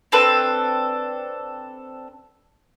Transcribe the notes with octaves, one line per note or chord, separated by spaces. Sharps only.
C4 D4 A4 B4